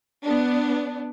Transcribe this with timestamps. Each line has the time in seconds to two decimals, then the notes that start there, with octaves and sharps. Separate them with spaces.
0.23 B3 D4